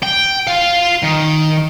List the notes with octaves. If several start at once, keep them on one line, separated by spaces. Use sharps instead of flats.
G5
F4 F5
D#3